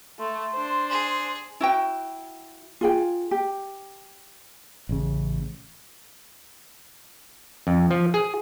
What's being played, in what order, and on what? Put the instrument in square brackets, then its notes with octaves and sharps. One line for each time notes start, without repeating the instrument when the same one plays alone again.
[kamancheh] A3 [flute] C6
[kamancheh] D4 C5
[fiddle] G#4
[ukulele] E4 F#4 G5
F4 G#4 G5
G4
[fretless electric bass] A1 C#3
[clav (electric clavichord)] F2
F3
G#4